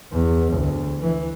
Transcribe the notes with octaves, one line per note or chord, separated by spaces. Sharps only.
E2
D2
E3